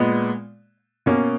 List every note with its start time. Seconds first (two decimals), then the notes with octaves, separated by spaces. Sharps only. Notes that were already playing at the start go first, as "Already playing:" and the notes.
Already playing: A#2 G#3 B3
1.06 B2 A#3 C#4